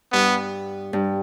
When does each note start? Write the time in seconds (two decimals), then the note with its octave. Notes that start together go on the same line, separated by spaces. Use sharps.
0.12 G2 B3
0.93 G2